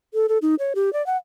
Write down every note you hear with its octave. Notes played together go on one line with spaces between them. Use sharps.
A4
A4
D#4
C#5
G4
D5
F#5